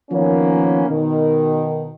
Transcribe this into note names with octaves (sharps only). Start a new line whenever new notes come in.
D#3 F3 A#3 B3 C#4
B2 D#3